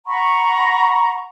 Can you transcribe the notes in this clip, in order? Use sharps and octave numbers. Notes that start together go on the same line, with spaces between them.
F#5 A#5 B5 C#6